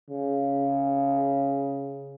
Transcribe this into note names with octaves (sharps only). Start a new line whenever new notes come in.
C#3